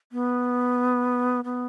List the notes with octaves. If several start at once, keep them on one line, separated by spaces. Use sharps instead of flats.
B3
B3